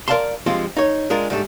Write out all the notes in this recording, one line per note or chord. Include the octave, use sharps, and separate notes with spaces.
A#4 B4 D5 F5 A5 C6
G2 F3 G#3 C4 F4
D#4 C#5
G#3 D4 F4 G#4 A#4
G#2 G3 A3 D4